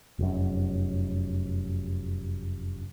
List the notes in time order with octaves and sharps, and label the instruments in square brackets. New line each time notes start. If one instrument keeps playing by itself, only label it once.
[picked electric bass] F1 F#2